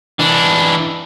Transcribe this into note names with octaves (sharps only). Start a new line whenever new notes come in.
E3 D4